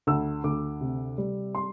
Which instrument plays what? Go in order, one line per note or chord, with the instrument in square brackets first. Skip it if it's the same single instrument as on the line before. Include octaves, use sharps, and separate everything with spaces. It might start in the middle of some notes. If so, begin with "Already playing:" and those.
[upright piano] D2 E6
D2 D6
C3
G3
C6